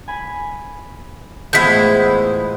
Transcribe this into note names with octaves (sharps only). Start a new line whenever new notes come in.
G#5 B5
A1 F3 G#3 A3 B3 E4 G6 B6